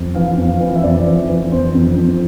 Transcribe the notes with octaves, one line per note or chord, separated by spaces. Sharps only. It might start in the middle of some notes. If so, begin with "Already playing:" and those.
Already playing: F2
E3 F5
F2
E3
E5
F2 D5
E3
E3
F2 C5
F2
F2